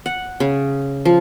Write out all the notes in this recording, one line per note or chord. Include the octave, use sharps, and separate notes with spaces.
F#5
C#3
F3